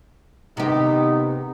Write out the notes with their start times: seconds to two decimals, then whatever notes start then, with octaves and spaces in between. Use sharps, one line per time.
0.57 C3 D#3 B3 D#4 G4